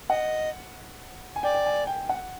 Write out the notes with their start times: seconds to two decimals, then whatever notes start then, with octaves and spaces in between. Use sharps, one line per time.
0.10 D#5 F#5
1.36 G#5
1.43 D5 G5
1.54 G5
1.66 G#5
1.87 G5
2.09 F#5